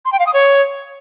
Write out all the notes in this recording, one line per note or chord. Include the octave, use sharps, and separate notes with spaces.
C6
G5
F5
D#6
C#5